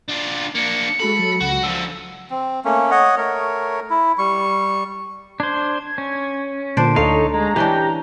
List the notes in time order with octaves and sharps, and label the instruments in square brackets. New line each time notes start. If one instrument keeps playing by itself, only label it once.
[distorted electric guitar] D4 F4
[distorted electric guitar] A#3 D4 [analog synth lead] C#7
[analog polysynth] G#3 F#4 A4 [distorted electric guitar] B5
[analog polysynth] F#3 A4
[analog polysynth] C#2 [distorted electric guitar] F#4
[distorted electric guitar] D3 F3 [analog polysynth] E6
[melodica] C4
A3 A#3 C#4
C#5 D#5 F#5
A3 A#4 C#5
E4
G3 C#6
[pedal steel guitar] D4 C5 [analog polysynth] G#6
[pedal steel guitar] C#4
[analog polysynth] A#2 D3 [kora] D4 C5 D5
[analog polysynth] D2 A4 [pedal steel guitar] D#4 C#5 [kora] F5
[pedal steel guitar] G#3 [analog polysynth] A#5
[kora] E3 C#4 D4 [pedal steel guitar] G4 G5